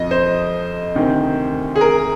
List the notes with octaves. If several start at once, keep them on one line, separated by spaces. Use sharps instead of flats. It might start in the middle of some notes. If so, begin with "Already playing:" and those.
Already playing: F2 F3 D#5
C5
D2 C3 D#3
G#4
A#4